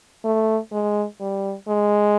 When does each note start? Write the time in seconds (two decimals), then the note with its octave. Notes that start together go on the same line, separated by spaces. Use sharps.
0.25 A3
0.72 G#3
1.20 G3
1.68 G#3